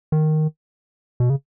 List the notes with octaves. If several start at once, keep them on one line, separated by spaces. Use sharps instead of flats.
D#3
B2
C#3